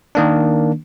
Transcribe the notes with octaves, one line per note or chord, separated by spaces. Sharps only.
D#3 A#3 D4